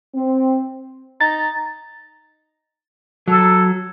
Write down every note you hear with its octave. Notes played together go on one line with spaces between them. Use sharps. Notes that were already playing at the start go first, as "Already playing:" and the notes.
C4
D#4 A6
F#3 A4